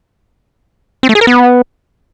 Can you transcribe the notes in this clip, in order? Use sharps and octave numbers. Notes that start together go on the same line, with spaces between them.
C4
A3
G#4
A#4
B3